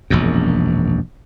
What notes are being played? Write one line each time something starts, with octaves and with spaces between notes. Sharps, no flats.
E1 A#1 F#2